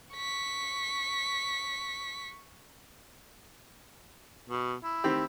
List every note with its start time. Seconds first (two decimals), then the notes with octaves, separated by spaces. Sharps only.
0.15 C#6 B6
4.49 B2
4.84 E4
5.04 D#3 C4 G4